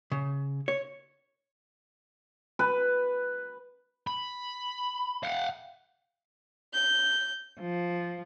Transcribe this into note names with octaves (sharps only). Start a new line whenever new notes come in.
C#3
C#5
B4
B5
F5 F#5
G6
F3